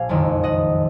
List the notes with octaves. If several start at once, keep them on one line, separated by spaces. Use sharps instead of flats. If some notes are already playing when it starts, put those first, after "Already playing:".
Already playing: A#1 F5 G#5
F#1 F2 D#3 G#3
D#5 F#5